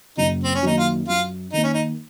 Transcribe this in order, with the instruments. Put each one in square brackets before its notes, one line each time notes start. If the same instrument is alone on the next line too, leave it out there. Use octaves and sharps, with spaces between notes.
[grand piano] F#1 [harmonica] D#4
[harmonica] C4
C#4
[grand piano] F#2 D#3 A#3 [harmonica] D#4
[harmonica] F4
[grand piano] F#2 [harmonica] F4
[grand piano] D#3 A#3 [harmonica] D#4
[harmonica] C#4
D#4